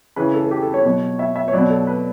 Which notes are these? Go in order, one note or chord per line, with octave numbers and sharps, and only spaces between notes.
C#3 E3 B4
A4
A4
G4
A4
C#5
B2 F#3
E5
E5
C#5
B2 F#3 D5
A4
B4